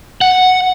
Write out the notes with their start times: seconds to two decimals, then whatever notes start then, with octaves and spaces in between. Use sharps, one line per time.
0.21 F#5